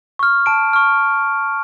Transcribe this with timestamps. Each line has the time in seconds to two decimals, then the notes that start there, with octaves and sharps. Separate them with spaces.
0.19 C#6 F6
0.46 A5 D7
0.73 C#6 F6